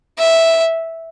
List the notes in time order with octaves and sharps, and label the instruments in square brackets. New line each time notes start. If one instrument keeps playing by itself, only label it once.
[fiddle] E5